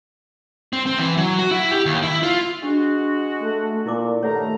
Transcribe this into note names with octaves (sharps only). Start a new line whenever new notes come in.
C4
C4
E3
F#3
F#4
E4
G4
D#2
E4
F4
G#3 D4 F#4
A3
A#2 E4 A#4 D6
G2 D#3 A3 C#5 F#5 A#5